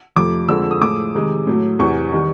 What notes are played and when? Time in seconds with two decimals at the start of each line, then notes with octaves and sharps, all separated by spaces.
0.16 F2 C3 F3 A3 D6
0.49 F2 D3 F3 G#3 E6
0.71 D#6
0.81 A2 F3 G#3 D6
1.15 C3 D#3 G#3
1.47 A2 F#3 A3
1.79 E2 C3 E3 C#6
2.12 D#3 G3